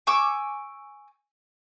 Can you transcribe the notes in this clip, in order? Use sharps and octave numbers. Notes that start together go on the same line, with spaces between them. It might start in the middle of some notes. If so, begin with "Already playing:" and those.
G#5 C#6 D6 E6